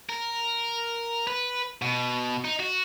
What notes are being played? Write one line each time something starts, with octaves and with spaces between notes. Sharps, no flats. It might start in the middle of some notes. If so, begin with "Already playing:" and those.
A#4
B4
B2
D#4
F#4